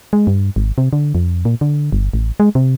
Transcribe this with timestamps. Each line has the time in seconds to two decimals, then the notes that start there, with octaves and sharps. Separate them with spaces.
0.13 G#3
0.27 G2
0.56 G#1
0.78 C3
0.93 D3
1.15 F2
1.45 A#2
1.61 D3
1.92 G1
2.13 A1
2.40 G#3
2.55 C3